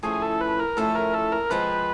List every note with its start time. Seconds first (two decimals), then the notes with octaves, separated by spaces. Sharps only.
0.03 A2 F3 A3 C#4 E4 G#4
0.22 A4
0.41 B4
0.59 A#4
0.77 A2 F3 A3 C#4 E4 A4
0.95 A#4
1.14 A4
1.32 A#4
1.50 F3 G#3 C4 B4